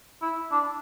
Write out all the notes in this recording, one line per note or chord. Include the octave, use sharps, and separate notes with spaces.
E4
D4